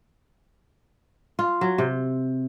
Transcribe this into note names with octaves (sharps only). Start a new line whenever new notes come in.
F4
F#3
C3